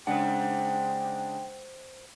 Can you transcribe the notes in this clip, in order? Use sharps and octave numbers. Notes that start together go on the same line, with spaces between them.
C#3 G#3 D4 C5 F#5 G5